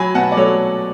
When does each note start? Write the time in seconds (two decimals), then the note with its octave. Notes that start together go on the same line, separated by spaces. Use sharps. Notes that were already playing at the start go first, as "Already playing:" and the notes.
Already playing: F#3 G#5 B5
0.15 B2 F#5 A5
0.32 D5
0.37 F#3 A4 C#5